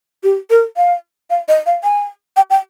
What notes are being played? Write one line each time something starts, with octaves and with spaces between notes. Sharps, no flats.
G4
A#4
F5
F5
D#5
F5
G#5
G5
G5